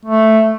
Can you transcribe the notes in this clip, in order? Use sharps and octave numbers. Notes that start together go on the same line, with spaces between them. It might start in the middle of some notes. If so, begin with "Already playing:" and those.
A3